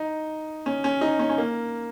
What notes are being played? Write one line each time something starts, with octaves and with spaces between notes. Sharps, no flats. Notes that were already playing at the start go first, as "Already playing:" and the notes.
Already playing: D#4
C#4
C#4
D#4
C#4
C#4
A#3